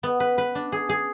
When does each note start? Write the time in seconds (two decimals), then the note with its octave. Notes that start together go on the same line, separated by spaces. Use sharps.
0.03 B3
0.20 B4
0.38 B4
0.55 D4
0.72 G#4
0.89 G#4